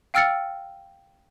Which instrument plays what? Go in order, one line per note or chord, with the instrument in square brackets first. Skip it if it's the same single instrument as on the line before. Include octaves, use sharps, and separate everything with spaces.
[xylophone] F5 G5 E6 F6 A6 C#7